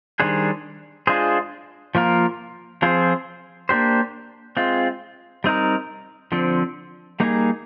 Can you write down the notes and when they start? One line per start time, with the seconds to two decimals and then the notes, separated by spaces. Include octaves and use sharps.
0.20 D#3 G3 D4 G#4 C5
1.07 G#3 D4 F4 G#4 C5
1.95 F3 A#3 F4 A#4
2.82 F3 C4 F4 G#4 C5
3.69 A#3 D4 G4 C5
4.57 G#3 C4 F4
5.44 G3 C4 D#4 A#4
6.32 D3 F3 C4
7.20 G3 A#3 D#4 G#4